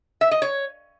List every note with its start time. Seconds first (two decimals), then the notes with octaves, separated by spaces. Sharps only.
0.21 E5
0.31 D#5
0.42 C#5